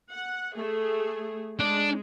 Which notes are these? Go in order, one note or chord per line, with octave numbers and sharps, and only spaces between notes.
F#5
A3 G#4
G#3 D4